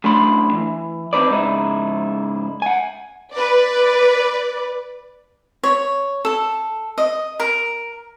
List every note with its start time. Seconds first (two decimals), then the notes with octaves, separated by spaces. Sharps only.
0.04 F#2 A2 A3 D4 B5 C6
0.53 E3
1.13 C4 D#4 B4 D5
1.31 G#2 C#3 D#4 E4
2.62 F#5 G#5
3.32 B4 D5
5.63 C#5
6.25 A4
6.98 D#5
7.40 A#4